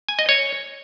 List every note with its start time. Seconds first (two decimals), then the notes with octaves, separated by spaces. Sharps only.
0.09 G#5
0.19 D#5
0.29 C#5